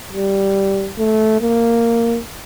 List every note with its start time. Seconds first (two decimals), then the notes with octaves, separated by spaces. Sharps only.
0.13 G3
0.98 A3
1.41 A#3